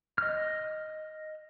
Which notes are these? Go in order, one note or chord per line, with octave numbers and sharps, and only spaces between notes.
D#5 F6